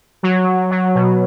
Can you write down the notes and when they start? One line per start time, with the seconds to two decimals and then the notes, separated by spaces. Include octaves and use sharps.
0.23 F#3
0.71 F#3
0.95 B2